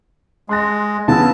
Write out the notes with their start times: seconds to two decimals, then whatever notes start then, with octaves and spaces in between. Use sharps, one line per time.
0.49 G#3 C6 F#6 A#6
1.08 C#3 B3 A5 E6